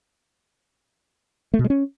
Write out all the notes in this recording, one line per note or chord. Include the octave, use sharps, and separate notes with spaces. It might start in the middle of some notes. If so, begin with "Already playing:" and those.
A3
B2
G#3
C#4